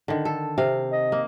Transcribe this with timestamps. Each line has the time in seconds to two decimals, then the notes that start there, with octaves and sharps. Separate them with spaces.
0.08 D3 D#3
0.25 A4
0.58 C3 F5
0.92 D#5
1.12 A#3